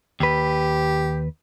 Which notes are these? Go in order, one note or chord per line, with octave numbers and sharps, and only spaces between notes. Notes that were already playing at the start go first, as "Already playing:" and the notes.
D#2 G4 B4